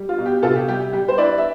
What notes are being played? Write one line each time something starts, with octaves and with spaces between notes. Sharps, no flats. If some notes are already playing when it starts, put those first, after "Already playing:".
Already playing: G3
F4
B2
G4
C3 F4 A4
G4
G3 G4
G3 G4
C5
E4 B4 D5
E5